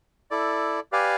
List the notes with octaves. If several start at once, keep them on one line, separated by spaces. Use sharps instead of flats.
E4 A4 D5
G4 B4 D5 F5 G#5